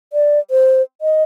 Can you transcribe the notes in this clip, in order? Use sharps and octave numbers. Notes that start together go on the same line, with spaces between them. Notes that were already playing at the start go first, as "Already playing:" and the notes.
D5
C5
D#5